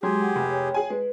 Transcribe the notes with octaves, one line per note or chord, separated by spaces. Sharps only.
F#3 G#3 G4 G#4 G5 C6
F#5
F1
C#5 G5
G#4 G#5
G#3 B4